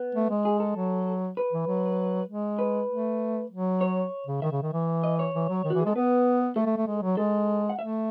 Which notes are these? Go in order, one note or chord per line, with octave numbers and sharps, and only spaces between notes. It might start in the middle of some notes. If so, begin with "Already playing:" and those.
Already playing: B3
A3
G#3
G#4
A4
F#3
B4
E3
F#3
G#3
B4
A3
F#3
C#5
C#3
D#3 E5
C#3
D#3
E3
D#5
C#5
E3
F#3
D#3
F#4
E3
G#4
G#3 A4
B3 B4
A3 A4
A3
A3
G#3
F#3
G#3 A4
F#5
A3 E5